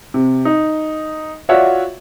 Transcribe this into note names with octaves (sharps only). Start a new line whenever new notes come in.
C3
D#4
F4 F#4 C#5 D5 E5 F#5